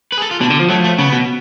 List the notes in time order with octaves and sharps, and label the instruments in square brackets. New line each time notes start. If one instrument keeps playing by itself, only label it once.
[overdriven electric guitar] B4
G#4
A4
F4
[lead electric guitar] B2 [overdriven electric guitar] D4
[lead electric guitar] D3
F3
[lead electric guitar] F#3 [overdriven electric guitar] A3
[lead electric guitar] F3
[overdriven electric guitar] A3
[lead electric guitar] C#3 [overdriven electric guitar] B3
[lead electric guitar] B2